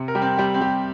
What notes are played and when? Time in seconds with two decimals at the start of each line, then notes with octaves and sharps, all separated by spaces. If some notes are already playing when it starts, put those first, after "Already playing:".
Already playing: C3
0.08 A#4
0.15 G3 G4
0.22 C4
0.37 G3 G4
0.54 C4
0.61 G3 G4